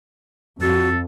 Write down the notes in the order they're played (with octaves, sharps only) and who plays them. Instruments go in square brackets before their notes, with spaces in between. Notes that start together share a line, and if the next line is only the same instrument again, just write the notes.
[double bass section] F2 [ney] F#4 [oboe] A4